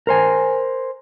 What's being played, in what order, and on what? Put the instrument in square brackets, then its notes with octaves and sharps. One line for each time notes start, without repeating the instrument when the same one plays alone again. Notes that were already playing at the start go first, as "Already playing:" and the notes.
[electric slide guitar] A#4 C5 G#5